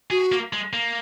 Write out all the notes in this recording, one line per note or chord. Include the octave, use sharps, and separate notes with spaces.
F#4 G#4
A#3
G#3
A#3